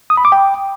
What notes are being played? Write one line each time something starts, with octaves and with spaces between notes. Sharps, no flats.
D#6
B5
D6
G5